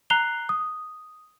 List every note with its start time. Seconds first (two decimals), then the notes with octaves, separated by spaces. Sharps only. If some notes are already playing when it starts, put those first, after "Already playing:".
0.10 A#5 F#6 C7 F7 G7
0.49 D#6